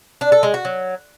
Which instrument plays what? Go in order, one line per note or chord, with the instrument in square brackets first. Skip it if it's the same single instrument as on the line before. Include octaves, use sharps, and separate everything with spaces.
[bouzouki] D4
A4
G#3
F#4
F#3